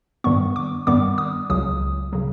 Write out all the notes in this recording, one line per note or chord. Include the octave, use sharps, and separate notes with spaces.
G2 D#3 G3 B3 C#6
D6
G2 D#3 G3 B3 D6
D#6
C#2 C#3 F#3 D#6
C#3 F#3